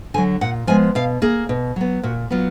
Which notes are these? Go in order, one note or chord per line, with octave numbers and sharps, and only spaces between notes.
D3 F#3 G#5
A#2 F#5
F3 G#3 B3 G#5
B2 F5
A#3 G#4
B2
F#3 B3
A#2 F#4
F#3 B3 F4